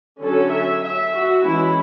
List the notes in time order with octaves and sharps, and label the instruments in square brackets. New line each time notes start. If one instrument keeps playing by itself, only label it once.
[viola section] D3 F#3 C#4 A4
E5
E5
F#4
E3 G#3 C#4 E4